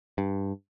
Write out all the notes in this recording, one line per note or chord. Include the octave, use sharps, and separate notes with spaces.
G2